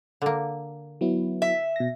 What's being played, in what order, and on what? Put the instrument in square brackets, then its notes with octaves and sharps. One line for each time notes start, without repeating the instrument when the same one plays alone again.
[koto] D3 A#3
[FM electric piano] F#3 B3 E4
[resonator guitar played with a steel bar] E5
[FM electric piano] B2 A#6